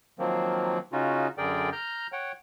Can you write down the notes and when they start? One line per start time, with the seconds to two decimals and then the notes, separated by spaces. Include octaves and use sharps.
0.19 D#3 F3 F#3 A#3 C4
0.93 C#3 C#4 D#4 F4 F#4
1.38 F#2 D3 G#4 A#4 D5 G5
1.73 A#5 F6 G6
2.12 C#5 F#5 G5